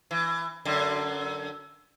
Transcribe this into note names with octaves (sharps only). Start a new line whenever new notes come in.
E3
F#2 D3